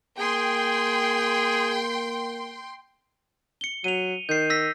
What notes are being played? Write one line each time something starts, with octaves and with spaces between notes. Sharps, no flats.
A#3 G#4 G5 C6
C#7 G7
F#3 D#7 F7
D#3 G6 C7
E6 A#6 B6